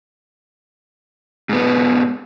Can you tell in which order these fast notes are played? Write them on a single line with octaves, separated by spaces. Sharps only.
G#2 B3 B2